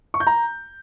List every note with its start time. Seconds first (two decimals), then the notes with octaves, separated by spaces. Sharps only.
0.14 C#6
0.20 G6
0.27 A#5